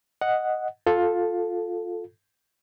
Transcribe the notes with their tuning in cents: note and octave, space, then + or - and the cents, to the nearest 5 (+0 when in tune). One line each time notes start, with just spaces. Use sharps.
D#5 +0 F#5 +0
F4 +15 A4 +0